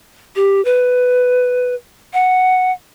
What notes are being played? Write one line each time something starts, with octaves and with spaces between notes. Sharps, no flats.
G4
B4
F#5